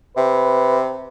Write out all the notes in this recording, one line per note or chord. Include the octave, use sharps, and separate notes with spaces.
C3 B4